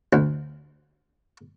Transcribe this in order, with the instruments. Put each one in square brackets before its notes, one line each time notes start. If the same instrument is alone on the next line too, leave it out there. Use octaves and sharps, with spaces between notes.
[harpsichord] D2